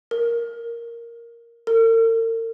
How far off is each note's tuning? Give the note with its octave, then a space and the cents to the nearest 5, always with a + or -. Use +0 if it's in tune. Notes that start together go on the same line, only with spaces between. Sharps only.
A#4 +0
A#4 -45